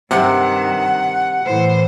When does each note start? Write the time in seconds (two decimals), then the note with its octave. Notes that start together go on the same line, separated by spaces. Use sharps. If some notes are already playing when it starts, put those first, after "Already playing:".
0.11 G2 C3 D#3 F#5
1.46 A2 E3 C5